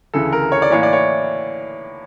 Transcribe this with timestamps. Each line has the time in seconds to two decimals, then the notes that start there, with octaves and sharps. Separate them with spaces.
0.14 D2 C#3 E3 A4
0.33 A#4
0.52 C#5
0.62 D5
0.70 A2 E3 A#3 C#5
0.83 D5
0.93 C#5